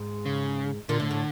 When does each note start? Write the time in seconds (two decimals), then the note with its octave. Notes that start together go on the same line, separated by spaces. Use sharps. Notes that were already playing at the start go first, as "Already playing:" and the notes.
Already playing: G#2
0.26 C#3
0.89 A#2 D3
1.00 A2
1.11 A2